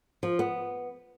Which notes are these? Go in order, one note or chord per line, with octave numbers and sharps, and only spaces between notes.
F3
B3